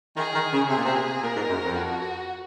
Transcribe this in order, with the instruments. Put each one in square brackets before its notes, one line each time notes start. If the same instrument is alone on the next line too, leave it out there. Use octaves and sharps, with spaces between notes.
[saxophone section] D#3 [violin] G#4
[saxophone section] D#3
C#3
[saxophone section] C3 [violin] G#4
[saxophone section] A#2
C3
[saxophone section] A#2 [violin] A#4
[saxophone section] G#2
F#2
F2
[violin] F#4